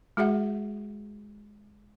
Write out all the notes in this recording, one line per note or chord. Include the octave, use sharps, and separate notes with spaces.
G#3 F#4 G#4 E5 F#5